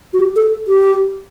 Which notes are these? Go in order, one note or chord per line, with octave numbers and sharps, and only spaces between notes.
F#4
G4
A4
G4